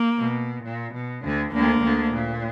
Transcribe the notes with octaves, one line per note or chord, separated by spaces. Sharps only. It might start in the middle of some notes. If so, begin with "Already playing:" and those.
Already playing: A#3
B2
A#2
B2
D2 D3
D2 D3 A#3
D2 D3
A#2